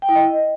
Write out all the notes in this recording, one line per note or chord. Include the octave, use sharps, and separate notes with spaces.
G5
E4
D#5